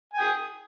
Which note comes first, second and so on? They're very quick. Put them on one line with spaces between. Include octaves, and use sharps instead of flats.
G#5 G5 D#6